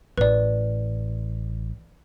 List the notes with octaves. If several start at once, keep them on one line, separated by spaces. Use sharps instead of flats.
A1 B4 D5